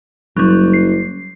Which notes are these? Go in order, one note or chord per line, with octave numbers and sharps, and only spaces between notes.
F#1 F#3 G3
C7